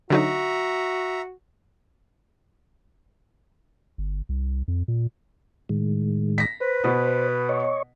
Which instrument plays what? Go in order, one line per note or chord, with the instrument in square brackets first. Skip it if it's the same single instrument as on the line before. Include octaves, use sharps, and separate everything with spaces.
[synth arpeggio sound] D3 F#3 D#4 [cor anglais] F#4 [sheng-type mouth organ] E5 A#5
[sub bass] G1
C2
F2
A#2
[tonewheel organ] A2 D#3 G#3
[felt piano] A#6 B6
[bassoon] B4 [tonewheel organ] C5
[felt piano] B2 B3
[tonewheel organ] C#5 D#5 C#6